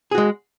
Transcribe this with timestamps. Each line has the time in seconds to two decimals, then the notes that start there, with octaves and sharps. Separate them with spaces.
0.11 G#4
0.15 F#4
0.18 G#3